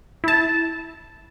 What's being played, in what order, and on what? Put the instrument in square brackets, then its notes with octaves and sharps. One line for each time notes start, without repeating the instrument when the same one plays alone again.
[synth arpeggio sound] E4 A5